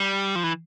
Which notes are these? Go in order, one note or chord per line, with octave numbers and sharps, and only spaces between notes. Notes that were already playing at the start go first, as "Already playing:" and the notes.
Already playing: G3
F3
E3